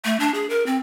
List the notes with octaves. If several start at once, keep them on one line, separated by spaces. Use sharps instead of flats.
A3
D4
G#4
A#4
C4